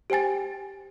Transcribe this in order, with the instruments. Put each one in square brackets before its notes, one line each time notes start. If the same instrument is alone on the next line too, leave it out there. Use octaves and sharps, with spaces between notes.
[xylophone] G4 C5 G5 G#5 A6